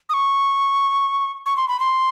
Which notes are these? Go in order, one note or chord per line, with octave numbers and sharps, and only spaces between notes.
D#6
C#6
C#6
C6
B5
C6